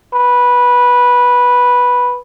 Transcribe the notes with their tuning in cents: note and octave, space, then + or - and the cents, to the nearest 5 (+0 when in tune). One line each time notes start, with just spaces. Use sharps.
B4 -10